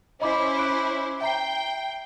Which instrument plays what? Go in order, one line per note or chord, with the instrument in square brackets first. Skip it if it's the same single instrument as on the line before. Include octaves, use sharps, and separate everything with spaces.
[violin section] C#4 E4 C5 [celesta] D#5 B5 D6
[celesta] D6 F#6 D7
[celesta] E5 A#5 C7 [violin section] G5